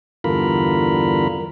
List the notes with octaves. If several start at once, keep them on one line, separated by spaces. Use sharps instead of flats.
E2 G2 D3 F4 A#4 B5